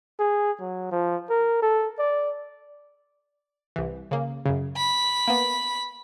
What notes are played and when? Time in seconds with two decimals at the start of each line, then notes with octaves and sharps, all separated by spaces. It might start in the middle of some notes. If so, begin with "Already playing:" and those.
0.19 G#4
0.60 F#3
0.91 F3
1.30 A#4
1.62 A4
1.99 D5
3.76 C2 E3
4.11 C#3 A#3
4.46 F#2 C#3
4.77 B5
5.28 A#3 B3